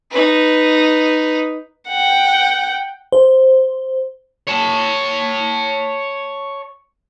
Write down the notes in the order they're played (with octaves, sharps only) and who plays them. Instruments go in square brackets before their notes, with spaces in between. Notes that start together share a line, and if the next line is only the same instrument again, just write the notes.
[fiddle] D#4 B4
[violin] F#5 G5
[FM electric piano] C5
[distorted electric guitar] C#5 A5